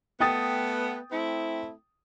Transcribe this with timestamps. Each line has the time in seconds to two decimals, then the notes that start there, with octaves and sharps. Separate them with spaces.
0.20 A3 B3 G5 D#6 A6
1.12 A3 C4 E4